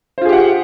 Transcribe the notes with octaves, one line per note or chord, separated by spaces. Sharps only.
F4 G4 G#4 C5 F#5